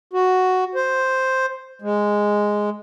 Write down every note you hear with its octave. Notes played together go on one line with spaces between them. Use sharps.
F#4
C5
G#3